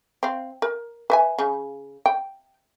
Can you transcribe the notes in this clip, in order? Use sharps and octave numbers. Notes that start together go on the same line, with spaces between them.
C4 F5
A#4
B4 E5 G#5
C#3
G5